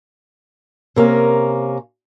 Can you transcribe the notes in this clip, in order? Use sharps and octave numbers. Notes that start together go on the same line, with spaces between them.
C3 A#3 C#4 A#4